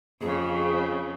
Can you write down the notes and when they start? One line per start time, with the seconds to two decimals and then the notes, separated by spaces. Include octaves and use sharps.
0.21 F2 C#3 G#4